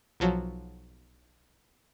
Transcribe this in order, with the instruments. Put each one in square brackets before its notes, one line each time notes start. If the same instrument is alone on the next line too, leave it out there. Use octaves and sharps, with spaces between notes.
[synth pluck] B1 F3 F#3